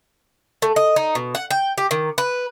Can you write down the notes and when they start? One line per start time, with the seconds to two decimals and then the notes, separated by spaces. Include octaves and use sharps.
0.62 A3
0.76 D#5
0.96 D#4
1.15 B2
1.35 F#5
1.51 G5
1.78 G4
1.91 D#3
2.18 B4